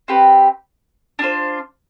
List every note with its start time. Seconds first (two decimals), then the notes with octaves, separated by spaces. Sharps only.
0.08 C4 G4 B4
1.19 D4 F4 C5